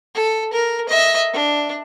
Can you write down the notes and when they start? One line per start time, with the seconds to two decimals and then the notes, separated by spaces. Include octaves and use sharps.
0.15 A4
0.53 A#4
0.89 D#5 E5
1.33 D4